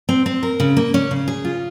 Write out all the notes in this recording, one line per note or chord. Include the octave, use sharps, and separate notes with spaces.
C4
C4
A#4
C#3
A#3
C#4
C#3
G#4
F4